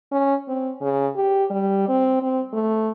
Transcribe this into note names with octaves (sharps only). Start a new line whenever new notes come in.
C#4
C4
C#3
G4
G3
C4
C4
A3